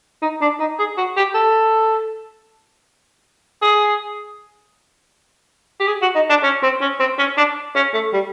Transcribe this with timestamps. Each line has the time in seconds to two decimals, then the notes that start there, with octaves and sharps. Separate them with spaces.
0.22 D#4
0.41 D4
0.59 D#4
0.79 G#4
0.97 F#4
1.17 G4
1.34 A4
3.61 G#4
5.80 G4
5.87 G#4
6.02 F#4
6.15 D#4
6.29 D4
6.43 C#4
6.63 C4
6.81 C#4
6.99 C4
7.18 C#4
7.37 D4
7.75 C#4
7.94 A3
8.13 G3